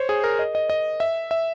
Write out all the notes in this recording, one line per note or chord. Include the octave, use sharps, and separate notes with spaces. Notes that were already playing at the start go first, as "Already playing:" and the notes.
Already playing: C5 C#5
G#4
A#4
D#5
D#5
D#5
E5
E5